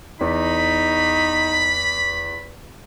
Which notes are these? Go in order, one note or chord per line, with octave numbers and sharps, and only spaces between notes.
E2 D#4 B5